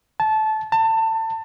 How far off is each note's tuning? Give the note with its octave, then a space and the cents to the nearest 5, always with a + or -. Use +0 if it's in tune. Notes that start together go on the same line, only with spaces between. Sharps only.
A5 -20
A5 +25